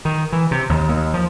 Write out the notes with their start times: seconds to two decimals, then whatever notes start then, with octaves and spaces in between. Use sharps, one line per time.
0.05 D#3
0.32 E3
0.51 C3
0.69 D#2
0.89 D#2
1.14 F3